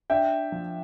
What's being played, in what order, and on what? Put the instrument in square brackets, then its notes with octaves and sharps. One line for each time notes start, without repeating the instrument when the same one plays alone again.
[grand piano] D4 E5 G5
F3